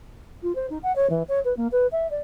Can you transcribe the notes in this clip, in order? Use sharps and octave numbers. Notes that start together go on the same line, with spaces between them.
F4
C5
D#4
F#5
C#5
E3
C#5
B4
A#3
B4
E5
D5